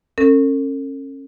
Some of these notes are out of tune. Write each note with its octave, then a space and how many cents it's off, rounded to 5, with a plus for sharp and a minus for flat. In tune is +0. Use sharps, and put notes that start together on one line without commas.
C#4 -30 A4 +45